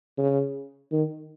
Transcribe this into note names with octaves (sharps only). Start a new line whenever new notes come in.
C#3
D#3